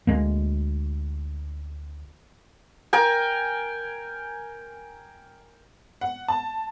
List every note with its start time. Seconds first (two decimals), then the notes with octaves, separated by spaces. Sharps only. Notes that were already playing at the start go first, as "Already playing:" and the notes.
0.07 D2 G#3 A#3
2.93 A#4 G5 G#5
6.01 F#5
6.28 A5